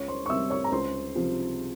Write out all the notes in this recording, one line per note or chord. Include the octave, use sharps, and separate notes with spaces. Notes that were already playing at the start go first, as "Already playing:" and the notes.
Already playing: C#2 C#5 C#6
C5 C6
C#6
C3 G3 C4 E5 E6
C#5 C#6
A#5
C#2 C5 C6
C3 F3